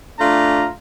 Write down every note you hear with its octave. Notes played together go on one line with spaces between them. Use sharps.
A3 D4 F4 A#5